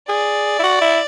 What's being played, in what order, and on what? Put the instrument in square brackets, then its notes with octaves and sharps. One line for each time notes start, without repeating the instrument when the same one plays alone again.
[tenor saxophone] G#4 [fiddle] D5
[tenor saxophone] E4
F#4
E4